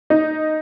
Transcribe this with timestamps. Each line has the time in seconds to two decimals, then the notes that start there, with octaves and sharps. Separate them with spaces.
0.10 D#4